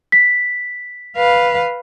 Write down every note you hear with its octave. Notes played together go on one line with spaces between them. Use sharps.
B6
B4 F5